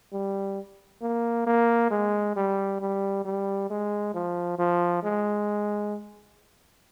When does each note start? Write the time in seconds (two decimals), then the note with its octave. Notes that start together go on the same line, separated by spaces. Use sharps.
0.13 G3
1.01 A#3
1.47 A#3
1.91 G#3
2.36 G3
2.81 G3
3.25 G3
3.70 G#3
4.14 F3
4.59 F3
5.03 G#3